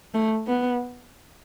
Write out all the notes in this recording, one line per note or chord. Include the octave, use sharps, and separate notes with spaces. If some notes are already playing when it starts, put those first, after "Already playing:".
A3
B3